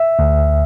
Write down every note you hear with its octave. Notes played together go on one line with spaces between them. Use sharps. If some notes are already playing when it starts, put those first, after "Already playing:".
Already playing: E5
D2